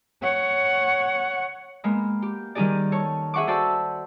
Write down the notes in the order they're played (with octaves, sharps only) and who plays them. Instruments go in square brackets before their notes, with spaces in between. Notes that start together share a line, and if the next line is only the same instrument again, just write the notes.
[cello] C#5 F#5
[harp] G#3 A#3 B3
G4
D#3 G3 D#4 G4 G#4 D5
A4 C#5
G#4 E5 F#5 C#6 D6
F#4 A4 C5 D5 E6